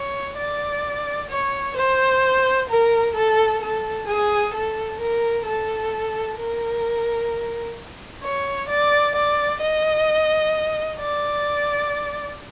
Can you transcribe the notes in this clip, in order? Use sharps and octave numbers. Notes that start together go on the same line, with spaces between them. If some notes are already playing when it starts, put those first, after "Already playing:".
Already playing: C#5
D5
C#5
C5
A#4
A4
A4
G#4
A4
A#4
A4
A#4
C#5
D5
D5
D#5
D5